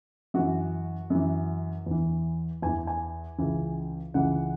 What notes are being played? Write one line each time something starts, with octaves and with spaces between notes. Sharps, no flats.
F#2 E3 F#4
F#2 E3
E2 E3
E2 E3 G#5
G#5
C#2 C#3 E3
C#2 C#3 E3 F#5